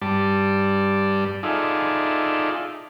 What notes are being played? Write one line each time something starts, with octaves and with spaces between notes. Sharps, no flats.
G2 G3 D5 A5
D#4 F4 G#4 A4 D5 E5